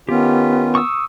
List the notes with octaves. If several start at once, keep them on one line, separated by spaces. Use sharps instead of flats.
D#3 B3 C#4 F4 G4
C#6 D#6 E6